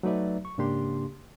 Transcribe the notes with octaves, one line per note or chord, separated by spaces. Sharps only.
F#3 A3 D#4 B4 D5 E5
C#6
G#2 C#3 A#3 D4 G4 C6